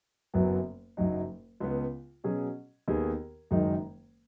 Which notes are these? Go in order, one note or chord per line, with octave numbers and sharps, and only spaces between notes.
F#1 F#2 F#3 B3
F#1 F#2 F#3 D#4
C#2 C#3 B3
B2 F#3 C#4 G#4
D#2 D#3 B3 D#4 G#4
F#1 F#2 D#3 G#3 D#4